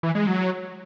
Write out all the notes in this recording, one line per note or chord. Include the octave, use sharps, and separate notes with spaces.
E3
G#3
F#3